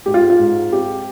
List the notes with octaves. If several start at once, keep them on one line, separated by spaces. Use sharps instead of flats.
G#2 G4
F4
F4
G#2
C4 G4